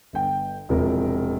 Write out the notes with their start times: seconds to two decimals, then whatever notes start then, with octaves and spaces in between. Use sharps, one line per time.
0.13 G1 G5
0.69 E1 A2 C3 F3 A#4